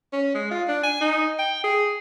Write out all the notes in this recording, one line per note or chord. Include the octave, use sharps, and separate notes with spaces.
C#4
G#3
F4
D4
G#5
D#4
G5
G#4